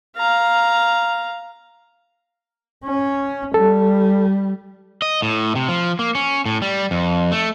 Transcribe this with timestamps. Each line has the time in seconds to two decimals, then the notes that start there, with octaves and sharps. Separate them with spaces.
0.17 F5 A#5
2.84 C#4
3.54 G3 A4
5.02 D#5
5.22 A2
5.55 C3
5.69 F3
5.99 A#3
6.15 C#4
6.46 A2
6.62 G3
6.91 F2
7.32 A3